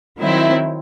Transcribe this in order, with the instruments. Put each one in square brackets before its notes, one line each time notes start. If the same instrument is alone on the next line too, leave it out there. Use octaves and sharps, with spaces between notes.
[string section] D#3 F#3 C4 E4